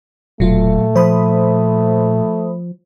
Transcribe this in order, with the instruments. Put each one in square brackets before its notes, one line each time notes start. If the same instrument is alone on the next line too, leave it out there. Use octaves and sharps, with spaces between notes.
[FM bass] E1 [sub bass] A#2 [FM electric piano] F#3 F4 [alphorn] A3
[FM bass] F3 [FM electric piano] C5 B5 D#6